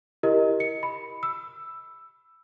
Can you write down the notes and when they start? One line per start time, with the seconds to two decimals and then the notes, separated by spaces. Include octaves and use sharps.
0.23 E4 G4 A#4 D#5
0.60 C#7
0.83 B5
1.23 E6